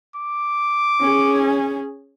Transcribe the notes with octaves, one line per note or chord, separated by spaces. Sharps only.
D6
C#4 G#4